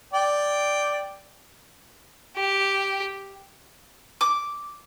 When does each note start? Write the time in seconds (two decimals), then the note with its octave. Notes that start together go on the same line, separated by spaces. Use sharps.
0.13 D5 G5
2.36 G4
4.21 D6